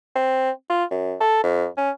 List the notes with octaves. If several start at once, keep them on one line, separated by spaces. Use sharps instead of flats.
C4
F4
F#2
A4
F2
C#4